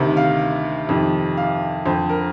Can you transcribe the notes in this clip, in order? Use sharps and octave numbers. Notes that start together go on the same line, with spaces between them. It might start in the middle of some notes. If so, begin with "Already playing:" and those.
Already playing: D2 C3 D#3
F5
F2 C3 D#3
F5
F2 D3 C5
A#4